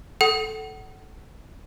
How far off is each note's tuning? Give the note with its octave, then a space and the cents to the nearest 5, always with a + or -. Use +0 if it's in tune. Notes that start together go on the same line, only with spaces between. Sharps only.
A4 -10 F#5 +25